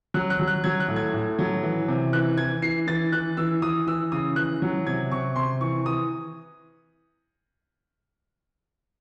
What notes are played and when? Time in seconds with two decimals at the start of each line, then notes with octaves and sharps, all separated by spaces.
0.14 F#3 F#6
0.30 F#6
0.40 F#3
0.47 F#6
0.64 F#3 G#6
0.80 F#6
0.88 A2
0.96 G#6
1.13 A2
1.39 F#3
1.63 E3
1.88 C3
2.13 E3 F#6
2.37 E3 G#6
2.62 E3 C7
2.87 E3 A6
3.12 E3 F#6
3.37 E3 E6
3.62 E3 D#6
3.87 E3 E6
4.12 C#3 D#6
4.36 E3 F#6
4.62 F#3
4.86 C3 G#6
5.11 C3 C#6
5.36 C3 C6
5.61 E3 C#6
5.86 E3 D#6